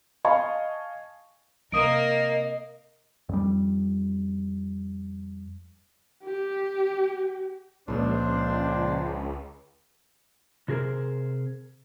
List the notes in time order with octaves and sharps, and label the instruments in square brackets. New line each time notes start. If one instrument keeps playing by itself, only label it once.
[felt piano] D#5 F5 G#5 A5 C#6
[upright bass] C3 [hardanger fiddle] A#3 A#4 [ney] D#5 [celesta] D#6 D7
[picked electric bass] F2 G3
[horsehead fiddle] G4
[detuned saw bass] C#2 [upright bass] A#2 F3 [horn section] D4 C5
[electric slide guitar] C3 F#4 G#4 A#4 C5